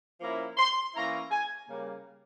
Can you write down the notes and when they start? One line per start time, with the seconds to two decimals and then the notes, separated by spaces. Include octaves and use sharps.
0.21 F3 A#3 C#4 E4 A#5
0.58 C6
0.95 E3 A#3 C#4 E4 A#5
1.31 G#5
1.68 C#3 G3 A#3